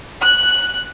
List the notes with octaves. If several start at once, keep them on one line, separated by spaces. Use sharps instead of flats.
F#6